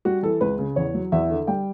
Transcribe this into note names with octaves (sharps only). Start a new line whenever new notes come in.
G3 F#4
E3 A4
C#2 B4
C#3
E2 C#5
F#3
E2 E5
D3
G3 G5